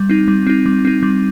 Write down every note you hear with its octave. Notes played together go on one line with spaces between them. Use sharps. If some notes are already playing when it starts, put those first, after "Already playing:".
Already playing: G3
C4 D#4
G3
C4 D#4
G3
C4 D#4
G3